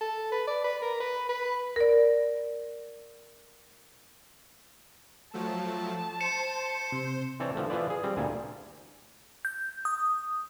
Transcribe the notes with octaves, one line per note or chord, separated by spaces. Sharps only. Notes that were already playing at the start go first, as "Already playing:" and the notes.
A4
B4
D5
B4
A#4
B4
B4
A#4 D5
F3 F#3 A3 A5
C5 C#7 E7
C3
E3 C4 C#5 D5 A5
D3 F3 A3
E3 F3 F4 B4 D5
G#4
G3 C4
D2 A#2 G#5 A5
G6
D#6